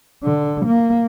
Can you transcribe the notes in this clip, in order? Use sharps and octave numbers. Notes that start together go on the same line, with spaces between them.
D3
A#3